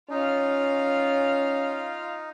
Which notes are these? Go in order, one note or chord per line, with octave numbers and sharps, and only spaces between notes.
C#4 D#4 F4 F5